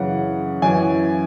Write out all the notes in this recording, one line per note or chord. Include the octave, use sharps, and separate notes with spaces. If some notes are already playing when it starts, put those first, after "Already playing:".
Already playing: F#2 C#3 E3 F#5
F#2 E3 G#5